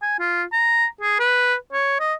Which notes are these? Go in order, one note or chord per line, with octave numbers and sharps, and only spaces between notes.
G#5
F4
A#5
G#4
B4
C#5
D#5